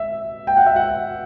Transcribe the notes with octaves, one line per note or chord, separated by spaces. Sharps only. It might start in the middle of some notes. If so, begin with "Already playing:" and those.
Already playing: E5
G5
F#5
E5
F#5